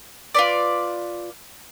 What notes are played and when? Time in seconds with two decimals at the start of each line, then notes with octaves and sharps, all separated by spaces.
0.35 F4 B4 D5